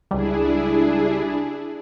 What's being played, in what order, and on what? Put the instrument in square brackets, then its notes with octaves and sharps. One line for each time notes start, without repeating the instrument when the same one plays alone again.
[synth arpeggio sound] C#2 G3 [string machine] D4 E4 G#4